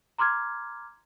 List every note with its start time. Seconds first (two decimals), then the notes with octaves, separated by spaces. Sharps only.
0.18 A#5 C6 D6 F6 G#6